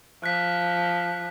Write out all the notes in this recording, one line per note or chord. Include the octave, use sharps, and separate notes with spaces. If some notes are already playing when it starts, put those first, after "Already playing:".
F3 F#6 B6